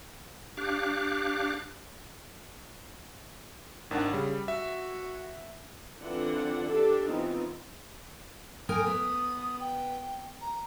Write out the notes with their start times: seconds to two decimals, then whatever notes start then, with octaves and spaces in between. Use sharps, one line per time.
0.57 D4 G4 F5 D6 F#6
3.91 G#1 D#3 D4 F#5
4.13 C#3 G3
4.48 F#4 E5
6.00 D3 E3 C4 D4 F4 F#5
6.67 D4 G4 A4
7.09 E3 B3 C4 D#4 F4
8.69 A#4 G5 G#5 D#6
8.86 B3
9.60 G5
10.41 A#5